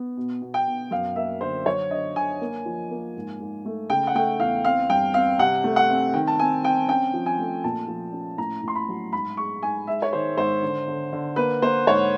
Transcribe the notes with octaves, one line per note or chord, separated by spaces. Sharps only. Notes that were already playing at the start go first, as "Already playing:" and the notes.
Already playing: B3
B2
B2
G5
B2
F#2 F5
A#3 E5
D3 C5
F#3 C#5
D3 D#5
D3 G#5
A#3
F3
A#3
G#2
G#2
A3
C#3 G5
F#5
A3 G5
E2 F5
C4 F5
G2 G5
C4 F5
C3 F#5
A3
F#5
C4
D#3 G5
A5
C4 G#5
C4 G5
C#4 G5
F3
G#5
A3
A#2 A5
F3
C#4
A2 A#5
A2
C6
B5
F#3
G#2 B5
G#3 C#6
G#2 G#5
G#3 E5
C#5
D#3 C5
G#2 C5
D3
D3
D3
A#3 B4
A#3 C5
G#2 C#5